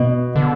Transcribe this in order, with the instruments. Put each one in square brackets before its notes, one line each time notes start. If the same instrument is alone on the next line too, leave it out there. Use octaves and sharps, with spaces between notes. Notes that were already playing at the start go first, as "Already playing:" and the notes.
Already playing: [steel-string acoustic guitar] B2
[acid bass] D3